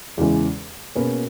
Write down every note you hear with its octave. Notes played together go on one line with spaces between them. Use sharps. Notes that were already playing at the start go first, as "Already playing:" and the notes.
E2 C#3 E3 G#3
B2 A#3 C#4 G#4 B4